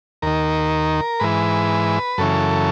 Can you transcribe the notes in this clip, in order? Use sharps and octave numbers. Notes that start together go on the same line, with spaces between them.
D#2 D#3 A#4
G#2 E3 B4
F#2 C#3 E3 A4